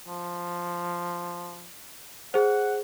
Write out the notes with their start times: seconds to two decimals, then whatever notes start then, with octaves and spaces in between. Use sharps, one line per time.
0.07 F3
2.34 G#4 C5 F#5